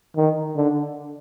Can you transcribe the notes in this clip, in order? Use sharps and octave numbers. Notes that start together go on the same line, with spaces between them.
D#3
D3